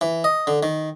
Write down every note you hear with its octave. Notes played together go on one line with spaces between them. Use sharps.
E3
D#5
D3
D#3